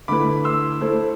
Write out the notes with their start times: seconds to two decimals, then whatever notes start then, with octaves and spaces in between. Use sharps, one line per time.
0.08 D3 A3 E4 B4 B5 D6
0.44 C6 E6
0.81 A3 E4 A4 C5